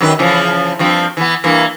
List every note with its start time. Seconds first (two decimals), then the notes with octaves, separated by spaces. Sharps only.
0.01 F#2 D#3 B4
0.19 C#3 E3 F3
0.79 G2 F3 C4
1.17 E3 B3
1.44 G2 E3 A#3